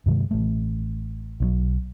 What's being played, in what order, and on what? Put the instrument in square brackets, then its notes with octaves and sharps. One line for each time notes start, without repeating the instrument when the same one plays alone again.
[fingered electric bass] G2 C3 D#3 G#3
A1 A3
B1 E3 F#3